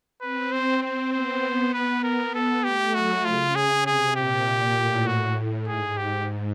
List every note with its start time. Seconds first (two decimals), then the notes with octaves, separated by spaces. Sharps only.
0.21 C4 B4
0.52 C5
0.83 C5
1.12 B3 C5
1.73 B3 B4
2.03 A#4
2.35 A4
2.64 A3 G4
2.94 F#3 F#4
3.25 C#3 F4
3.55 G#4
3.86 C3 G#4
4.16 A#2 G4
4.77 A2
5.07 F#4
5.38 A2
5.68 G#2 G#4
5.97 G4